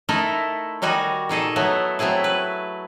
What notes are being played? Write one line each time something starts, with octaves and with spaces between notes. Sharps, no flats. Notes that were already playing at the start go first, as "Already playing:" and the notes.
A3 D#4 E4 A4 A#4
D#3 G3 D#4 F#4 G#5
A#2 D#4 G#4 A4
F#3 A3 B3 E4
F#3 A3 C4 E4 G#4
B4